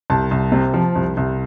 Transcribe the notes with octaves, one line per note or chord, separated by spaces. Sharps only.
C2 A5
C2
C3
F3
C2
C2